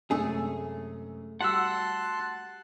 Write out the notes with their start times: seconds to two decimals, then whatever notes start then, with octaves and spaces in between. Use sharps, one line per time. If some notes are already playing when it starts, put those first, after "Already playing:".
0.11 F#2 C3 G#3 A3 G#4
1.41 G3 F#4 F#5 A5 C6 E6 F#6 B6